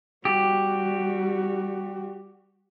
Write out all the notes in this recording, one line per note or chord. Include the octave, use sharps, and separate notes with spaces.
G3 F#4 G4